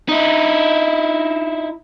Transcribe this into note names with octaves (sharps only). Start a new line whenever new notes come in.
D#4 E4